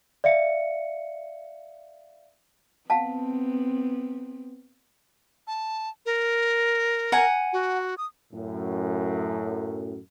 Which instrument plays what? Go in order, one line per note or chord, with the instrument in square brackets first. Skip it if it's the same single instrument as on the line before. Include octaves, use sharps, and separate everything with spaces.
[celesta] D5 E5 F5 C#7
[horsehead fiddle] B3 C4 [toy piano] F5 F#5 A5
[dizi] A5
A#4
[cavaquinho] F#5 G#5 A#5
[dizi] F#4
D#6
[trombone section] F#2 A2